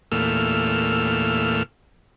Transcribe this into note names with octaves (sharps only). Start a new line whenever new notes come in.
E2 A#2 A3 E6 F6